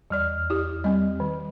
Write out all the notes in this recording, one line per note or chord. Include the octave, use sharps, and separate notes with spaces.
E2 G3 D5 F6
E4 G4
G3 C4 D#5
D#3